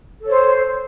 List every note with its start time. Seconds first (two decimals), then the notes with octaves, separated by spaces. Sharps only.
0.20 A4
0.24 C#5
0.29 C5